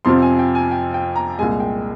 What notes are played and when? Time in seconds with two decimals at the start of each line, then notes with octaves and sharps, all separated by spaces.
0.05 F2 C3 F3 C4 F4 C6
0.22 G#5
0.39 G5
0.55 G#5
0.71 G5
0.94 G5
1.16 A#5
1.38 C2 A#2 G#3 G#5
1.60 G5